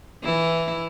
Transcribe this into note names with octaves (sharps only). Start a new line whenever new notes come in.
E3 E4